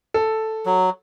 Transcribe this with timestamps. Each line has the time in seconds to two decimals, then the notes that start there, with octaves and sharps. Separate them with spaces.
0.14 A4
0.66 F#3